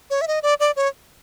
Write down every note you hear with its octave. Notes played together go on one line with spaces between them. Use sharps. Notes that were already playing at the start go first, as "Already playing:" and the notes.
C#5
E5
D#5
D5
D5
C#5